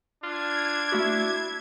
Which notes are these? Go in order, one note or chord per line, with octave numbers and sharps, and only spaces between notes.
D4 F4 G#6
A3 E4 F#4